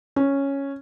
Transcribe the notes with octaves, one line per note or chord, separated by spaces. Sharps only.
C#4